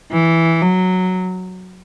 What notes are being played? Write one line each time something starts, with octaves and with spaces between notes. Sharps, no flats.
E3
F#3